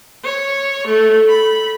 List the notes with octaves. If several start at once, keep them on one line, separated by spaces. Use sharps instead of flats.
C#5
A3
B5